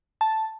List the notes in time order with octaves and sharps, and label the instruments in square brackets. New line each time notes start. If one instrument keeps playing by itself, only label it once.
[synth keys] A5